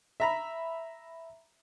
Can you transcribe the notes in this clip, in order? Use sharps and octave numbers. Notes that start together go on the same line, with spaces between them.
E5 A#5 B5